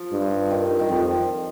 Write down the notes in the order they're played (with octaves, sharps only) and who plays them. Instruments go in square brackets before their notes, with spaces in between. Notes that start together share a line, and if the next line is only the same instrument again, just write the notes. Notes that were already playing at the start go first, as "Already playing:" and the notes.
Already playing: [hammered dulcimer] F3
[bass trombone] G2
[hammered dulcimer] D#3
D#3
[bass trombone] F2 [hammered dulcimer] F3